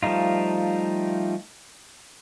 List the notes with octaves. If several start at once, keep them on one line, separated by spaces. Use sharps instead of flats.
F3 G3 A3 D#4 F4